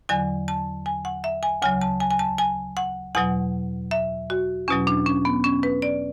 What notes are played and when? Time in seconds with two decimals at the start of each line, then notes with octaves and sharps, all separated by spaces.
0.09 E2 D3 F#3 G#5
0.48 A5
0.86 G#5
1.05 F#5
1.24 E5
1.43 G#5
1.62 D2 C#3 F#3 G#5
1.81 A5
2.00 G#5
2.11 G#5
2.19 A5
2.38 G#5
2.77 F#5
3.15 E2 B2 F#3 F#5
3.91 E5
4.30 F#4
4.68 E2 B2 F#3 C#4
4.87 D4
5.06 C#4
5.25 B3
5.44 C#4
5.63 B4
5.82 D5